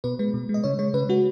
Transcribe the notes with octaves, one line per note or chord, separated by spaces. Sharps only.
B2 B4
G#3 B4
B2
G#3
D#5
C#3 C#5
G#3 C#5
C#3 B4
G#3 F#4